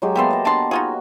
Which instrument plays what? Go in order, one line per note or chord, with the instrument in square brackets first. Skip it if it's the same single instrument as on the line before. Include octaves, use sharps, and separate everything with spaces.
[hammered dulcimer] F#3 G#3 G4
[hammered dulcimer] A#3 B3 A5 [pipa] G4 E5 C6
[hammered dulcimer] D#5 A#5
[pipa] D4 A5 C6
[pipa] D#4 F4 G#4 [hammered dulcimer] F#4